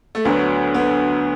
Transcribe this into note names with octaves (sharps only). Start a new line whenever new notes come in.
A3
D2 D3 F#3 B3
B3